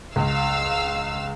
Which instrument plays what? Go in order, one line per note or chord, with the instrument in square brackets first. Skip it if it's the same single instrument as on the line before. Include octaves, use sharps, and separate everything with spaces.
[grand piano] C#2 [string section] F5 E6